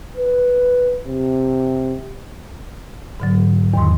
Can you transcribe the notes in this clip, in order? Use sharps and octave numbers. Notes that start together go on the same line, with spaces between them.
B4
C3
G#2 D3 F#3
E2 D#3 C6